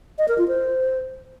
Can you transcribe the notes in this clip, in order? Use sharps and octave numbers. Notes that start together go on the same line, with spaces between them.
D#5
A#4
F4
C5